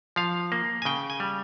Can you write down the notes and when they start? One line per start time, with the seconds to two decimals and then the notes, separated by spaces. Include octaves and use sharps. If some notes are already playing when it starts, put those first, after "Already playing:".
0.16 F3 F5
0.52 A#3
0.82 G#5
0.85 C#3 G5
1.10 G#5
1.20 G3